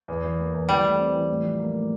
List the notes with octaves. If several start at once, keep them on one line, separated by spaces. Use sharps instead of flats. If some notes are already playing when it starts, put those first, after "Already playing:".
E2
E3
A#3
E2
E3 G3
A3
C4
E3
A2
F3
A#3
A2